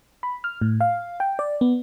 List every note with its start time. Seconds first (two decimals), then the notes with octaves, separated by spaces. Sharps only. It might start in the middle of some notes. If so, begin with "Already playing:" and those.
0.23 B5
0.44 F6
0.61 A2
0.81 F5
1.20 G5
1.39 D5
1.61 B3